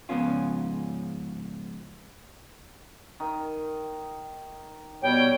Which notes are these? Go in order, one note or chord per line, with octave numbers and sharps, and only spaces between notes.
G#2 C#3 F3 B3 C#4 F4
D#3
B2 G3 C#5 G5